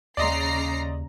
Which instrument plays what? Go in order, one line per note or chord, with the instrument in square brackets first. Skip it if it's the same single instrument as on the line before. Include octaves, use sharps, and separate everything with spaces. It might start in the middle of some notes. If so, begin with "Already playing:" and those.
[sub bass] D#2 [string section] C#3 A#5 C7 [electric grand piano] D5 D#5 C6